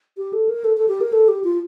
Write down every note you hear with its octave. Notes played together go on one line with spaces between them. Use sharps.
G4
A4
A#4
A4
A4
G4
A#4
A4
G4
F4